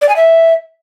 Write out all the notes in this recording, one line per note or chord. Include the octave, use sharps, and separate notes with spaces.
D5
G#5
E5